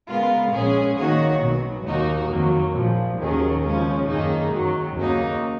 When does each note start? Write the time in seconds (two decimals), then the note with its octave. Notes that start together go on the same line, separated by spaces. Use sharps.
0.09 C#3 G#3 B3 F4 A#4
0.52 A#1 A#2 G#3 C#4 G#4
0.97 D#3 A#3 D#4 F#4 C#5
1.41 B1 B2 F#3
1.86 D#2 D#3 A#3 D#4 F#4
2.30 F2 D#3 F#3 A#3
2.75 A#1 A#2 F3
3.19 D#2 D#3 F#3 C#4 G#4
3.63 D#2 C#3 F3 G#3 C#4
4.08 F#2 D#3 A#3 D#4 G#4
4.52 F#2 D#3 F#3
4.97 D#2 C#3 F#3 A#3 D#4